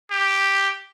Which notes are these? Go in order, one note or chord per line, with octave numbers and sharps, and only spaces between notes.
G4